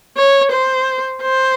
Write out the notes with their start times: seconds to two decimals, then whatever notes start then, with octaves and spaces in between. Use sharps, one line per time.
0.18 C#5
0.53 C5
1.23 C5